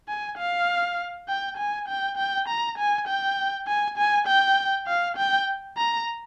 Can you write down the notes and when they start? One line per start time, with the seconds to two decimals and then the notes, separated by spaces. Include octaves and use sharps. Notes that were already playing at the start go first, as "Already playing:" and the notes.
0.09 G#5
0.38 F5
1.28 G5
1.57 G#5
1.88 G5
2.17 G5
2.48 A#5
2.78 G#5
3.08 G5
3.67 G#5
3.98 G#5
4.27 G5
4.87 F5
5.17 G5
5.77 A#5